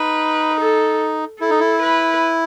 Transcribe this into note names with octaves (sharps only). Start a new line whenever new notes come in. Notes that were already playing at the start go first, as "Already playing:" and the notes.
Already playing: D#4 B4
A4
E4 A4
D#4
E4
B4